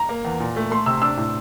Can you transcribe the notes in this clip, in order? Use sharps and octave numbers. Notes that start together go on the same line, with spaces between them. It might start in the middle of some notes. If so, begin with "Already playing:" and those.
Already playing: A#5
A#3
E2
A#2
A3
A3 C6
C3 E6
D4 E6
A2